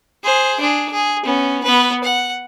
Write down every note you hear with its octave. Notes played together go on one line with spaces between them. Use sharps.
G#4 C5
D4 G#4
G#4
B3 C#4
B3 B4
F#5